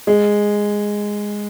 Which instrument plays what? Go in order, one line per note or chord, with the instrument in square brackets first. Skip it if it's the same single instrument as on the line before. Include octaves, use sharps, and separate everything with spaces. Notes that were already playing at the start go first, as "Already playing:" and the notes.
[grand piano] G#3